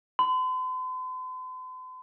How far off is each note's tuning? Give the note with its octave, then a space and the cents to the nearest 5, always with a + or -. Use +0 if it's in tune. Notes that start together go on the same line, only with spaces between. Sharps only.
C6 -45